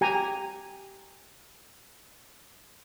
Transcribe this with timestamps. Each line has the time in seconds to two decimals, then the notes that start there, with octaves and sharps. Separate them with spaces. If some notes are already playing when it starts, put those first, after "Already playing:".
0.01 G4 G#5 A#5